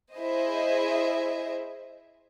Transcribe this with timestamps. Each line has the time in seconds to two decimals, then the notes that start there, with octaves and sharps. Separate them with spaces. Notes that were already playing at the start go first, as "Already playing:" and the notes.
0.16 E4 G#4 C5 D#5 E5